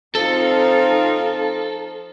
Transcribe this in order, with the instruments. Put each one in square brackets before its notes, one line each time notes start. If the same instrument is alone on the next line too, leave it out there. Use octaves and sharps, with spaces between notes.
[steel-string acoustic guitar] F3 C5 [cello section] C4 D#4 F4 [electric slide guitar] A4